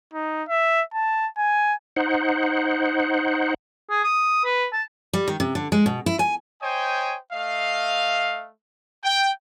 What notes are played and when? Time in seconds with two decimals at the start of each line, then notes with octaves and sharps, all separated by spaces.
0.13 D#4
0.49 E5
0.94 A5
1.38 G#5
1.96 D#4 C5 F#5
3.90 G#4
4.04 D#6
4.44 B4
4.73 A5
5.13 G3
5.28 D#3
5.40 C3
5.55 D3
5.72 G#3
5.86 B2
6.06 E4
6.19 G#5
6.61 C5 C#5 D#5 G5 G#5
7.32 A3 D#5 F5
9.04 G5